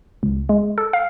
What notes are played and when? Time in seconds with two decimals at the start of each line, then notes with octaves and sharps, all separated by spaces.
0.23 C#2
0.49 G#3
0.78 A4
0.93 F5